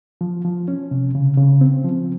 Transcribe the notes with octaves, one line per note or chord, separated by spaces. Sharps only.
F3
F3
C#4
C3
C#3
C#3
C4
F3